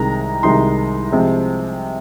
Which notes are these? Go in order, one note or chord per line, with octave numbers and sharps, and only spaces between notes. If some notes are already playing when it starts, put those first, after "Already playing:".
Already playing: C2 C3 D#3 G#3 D#4 A#5
C2 C3 D#3 G#3 D#4 C6
C3 F3 G#3 C4